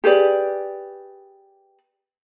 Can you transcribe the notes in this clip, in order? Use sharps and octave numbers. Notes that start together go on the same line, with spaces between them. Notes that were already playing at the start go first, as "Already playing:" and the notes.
G4 G#4 B4 D5